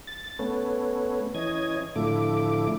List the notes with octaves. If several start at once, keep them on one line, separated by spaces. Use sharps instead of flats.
A6
A3 B3 C#4
E3 C#4 D#5 G#6
A2 D3 F3 A3 E4 D6